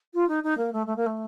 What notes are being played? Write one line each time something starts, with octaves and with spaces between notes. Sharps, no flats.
F4
D#4
D#4
A#3
A3
A3
A#3
A3